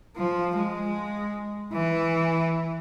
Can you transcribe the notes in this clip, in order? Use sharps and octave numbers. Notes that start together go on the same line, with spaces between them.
F3
G#3
E3